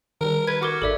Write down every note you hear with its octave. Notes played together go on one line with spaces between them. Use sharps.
D#3 G3 A#4
B4 G#6
F#4 A#4 D6 F6
G#1 G#2 A4 D5 E5